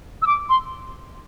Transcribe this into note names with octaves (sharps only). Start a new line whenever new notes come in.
E6
D6
C6